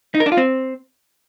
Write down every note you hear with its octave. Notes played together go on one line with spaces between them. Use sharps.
D#4
A#4
D4
F4
C4